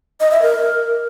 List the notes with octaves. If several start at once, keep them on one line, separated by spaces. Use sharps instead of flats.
D#5
E5
A#4